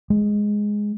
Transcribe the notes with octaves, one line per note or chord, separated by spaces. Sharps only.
G#3